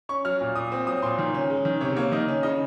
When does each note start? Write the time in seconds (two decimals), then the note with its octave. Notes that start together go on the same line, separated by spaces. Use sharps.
0.09 C#4 C#6
0.25 F#3 F6
0.41 A#2
0.56 A#2 D#6
0.72 C4
0.87 F#3 D#6
1.02 A#2 C6
1.18 D#3
1.34 C#4
1.50 G#3
1.65 D#3
1.81 C3 C#5
1.96 A#3 C#5
2.12 D#3 D#5
2.28 C#4
2.43 C#3 D#5